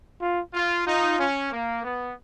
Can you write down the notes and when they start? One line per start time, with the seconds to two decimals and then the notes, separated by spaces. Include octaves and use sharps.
0.22 F4
0.54 F4
0.86 D#4 F4
1.19 C#4
1.51 A#3
1.84 B3